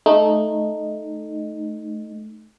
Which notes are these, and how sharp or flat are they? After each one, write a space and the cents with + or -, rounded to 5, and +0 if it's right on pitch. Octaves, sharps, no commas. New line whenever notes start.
A3 -15 D#4 -10